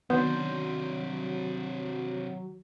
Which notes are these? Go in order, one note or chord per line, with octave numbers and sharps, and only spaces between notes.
C3 D#3 F#3 B3 D4 C6 G6